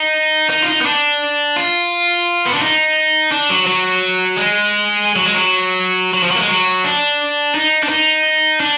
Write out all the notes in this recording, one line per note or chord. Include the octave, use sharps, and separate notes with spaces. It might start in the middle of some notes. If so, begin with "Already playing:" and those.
Already playing: D#4
D#4
F4
D#4
B3
D4
F4
B3
D4
D#4
D4
F#3
F#3
G#3
F#3
G#3
F#3
F#3
F3
F#3
A#3
G#3
F#3
D4
D#4
D4
D#4
D4